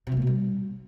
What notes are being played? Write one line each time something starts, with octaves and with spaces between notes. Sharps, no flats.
C3
F#3
A#3
B2
G3